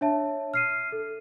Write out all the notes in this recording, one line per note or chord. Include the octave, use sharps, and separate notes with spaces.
D4 C#5 E5 A5
F6 C7 D#7
A4